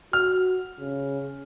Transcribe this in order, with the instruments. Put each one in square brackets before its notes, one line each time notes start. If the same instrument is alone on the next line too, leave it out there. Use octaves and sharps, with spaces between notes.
[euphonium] F#4 [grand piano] F6
[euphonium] C#3